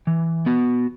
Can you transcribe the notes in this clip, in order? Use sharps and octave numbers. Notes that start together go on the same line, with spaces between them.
E3
B3 F#4